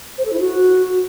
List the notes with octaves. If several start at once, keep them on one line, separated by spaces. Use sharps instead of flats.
C5
A4
E4
F#4